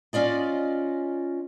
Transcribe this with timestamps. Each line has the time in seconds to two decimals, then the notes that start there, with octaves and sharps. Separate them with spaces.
0.13 C#4 F4 D5 D#5